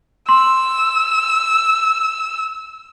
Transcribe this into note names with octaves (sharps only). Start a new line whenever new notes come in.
C6 E6